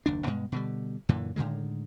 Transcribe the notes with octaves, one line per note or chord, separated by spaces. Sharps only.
F#1 D#2 D4
G2 B2 G#3
B2 D3 G3
F#2 A#2 D3 E3
A2 D3 D#3 G#3